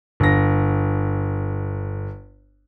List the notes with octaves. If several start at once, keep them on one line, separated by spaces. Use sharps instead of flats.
G1 A#6